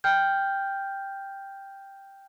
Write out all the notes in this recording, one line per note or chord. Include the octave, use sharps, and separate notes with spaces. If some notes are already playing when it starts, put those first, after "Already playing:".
G5 F6 G6